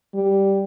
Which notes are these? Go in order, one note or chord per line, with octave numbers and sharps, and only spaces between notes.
G3